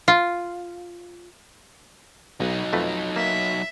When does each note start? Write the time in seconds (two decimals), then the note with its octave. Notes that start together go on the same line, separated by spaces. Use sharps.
0.08 F4
2.40 B1 F#3 D#4
2.73 F2 A3 B4
3.16 A#3 E5